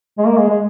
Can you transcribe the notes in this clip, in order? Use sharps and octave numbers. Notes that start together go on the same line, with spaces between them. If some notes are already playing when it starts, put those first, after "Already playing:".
G#3
A#3
G#3
G#3